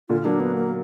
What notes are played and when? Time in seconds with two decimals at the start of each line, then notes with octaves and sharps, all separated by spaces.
0.09 A#2 D3 F4
0.25 F#3 A#3 D4
0.40 B3
0.56 A#3